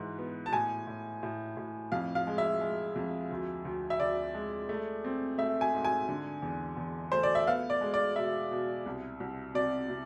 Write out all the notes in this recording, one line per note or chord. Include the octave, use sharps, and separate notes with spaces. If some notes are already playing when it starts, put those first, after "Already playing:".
Already playing: G#2 E3
B3
A5
A2 G#5
A2
A2
A2
F2 F5
F5
G#3
E5
G#3
F2
D2
D2
E5
D2 D5
G#3
A3
C4
A3 E5
G#5
G#2
G#5
D3
E2
E2
A3 C5
D5
E5
B3 F5
D5
G#3
D5
B2 E5
B2
C2
C2
C3 D5
C3